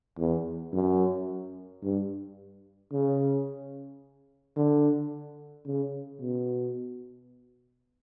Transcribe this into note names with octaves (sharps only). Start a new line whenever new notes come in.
E2
F#2
G2
C#3
D3
C#3
B2